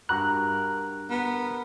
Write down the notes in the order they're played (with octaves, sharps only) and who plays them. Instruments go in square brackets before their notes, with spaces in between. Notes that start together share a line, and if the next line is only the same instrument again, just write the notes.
[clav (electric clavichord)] G2 F#4 A#5 [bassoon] A#4 [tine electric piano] F#6
[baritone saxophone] B3 [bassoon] A#4